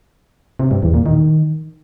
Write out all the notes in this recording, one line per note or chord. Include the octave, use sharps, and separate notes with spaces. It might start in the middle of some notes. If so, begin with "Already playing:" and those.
C3
G2
E2
A#2
D#3